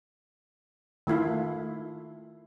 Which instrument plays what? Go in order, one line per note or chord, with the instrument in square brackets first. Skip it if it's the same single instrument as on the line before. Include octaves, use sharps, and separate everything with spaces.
[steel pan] D#3 A3 E4 F4